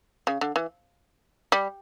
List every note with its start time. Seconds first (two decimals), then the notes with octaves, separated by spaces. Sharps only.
0.27 C#3
0.41 D3
0.56 E3
1.52 G3